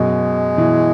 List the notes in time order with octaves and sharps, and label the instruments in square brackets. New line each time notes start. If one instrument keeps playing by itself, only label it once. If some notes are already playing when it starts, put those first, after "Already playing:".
Already playing: [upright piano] F#2 B2 [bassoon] G#3
[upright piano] B2 E3